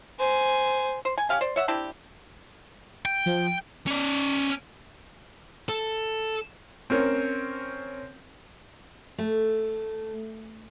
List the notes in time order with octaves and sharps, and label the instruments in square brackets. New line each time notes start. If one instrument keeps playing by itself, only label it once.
[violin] C5 G#5
[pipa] C5
G#5
C#4 G4 F5 G#5
C5 D5
C#5 E5 F#5
C4 D4 E4 G4
[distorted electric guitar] G5
[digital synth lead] F3
[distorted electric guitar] C#4 D5
A4
[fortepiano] C4 C#4 A#4
[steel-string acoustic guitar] A3